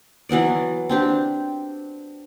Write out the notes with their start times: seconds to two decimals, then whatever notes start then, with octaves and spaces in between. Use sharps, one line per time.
0.29 E3 F#3 B3 D5
0.89 C4 D4 G4